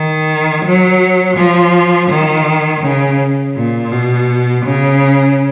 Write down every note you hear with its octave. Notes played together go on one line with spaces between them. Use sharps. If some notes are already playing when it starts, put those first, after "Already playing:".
Already playing: D#3
F#3
F3
D#3
C#3
A#2
B2
C#3